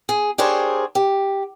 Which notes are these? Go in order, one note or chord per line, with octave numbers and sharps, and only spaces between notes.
G#4
D4 G4 G#4 A#4 C5 C#5
G4